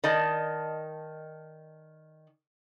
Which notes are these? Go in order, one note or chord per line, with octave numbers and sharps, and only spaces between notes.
D#3 D5 D#5 A5